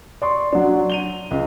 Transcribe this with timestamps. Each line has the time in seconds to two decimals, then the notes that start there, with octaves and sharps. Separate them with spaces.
0.22 D5 C6 C#6
0.52 F#3 D4
0.90 D#7 F7 G7
1.31 C#2